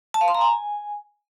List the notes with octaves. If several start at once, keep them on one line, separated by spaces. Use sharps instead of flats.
A5
F5
C6
A#5
G#5